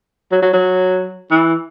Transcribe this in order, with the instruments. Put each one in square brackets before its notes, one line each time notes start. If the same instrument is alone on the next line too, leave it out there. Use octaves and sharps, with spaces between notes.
[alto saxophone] F#3
F#3
F#3
E3